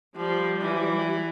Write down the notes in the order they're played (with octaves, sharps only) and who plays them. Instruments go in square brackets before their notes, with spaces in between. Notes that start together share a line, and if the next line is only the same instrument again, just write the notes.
[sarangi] F3 [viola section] G3
[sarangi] E3